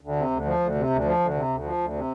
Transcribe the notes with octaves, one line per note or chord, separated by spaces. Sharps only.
D2
C3
D2
F3
D2
C3
D2
F3
D2
C3
D2
F3
D2
C3